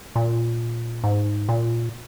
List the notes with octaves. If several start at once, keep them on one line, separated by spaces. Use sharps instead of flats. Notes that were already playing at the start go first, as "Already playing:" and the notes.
A#2
G#2
A#2